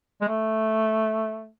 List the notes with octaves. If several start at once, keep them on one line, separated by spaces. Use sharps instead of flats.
G#3
A3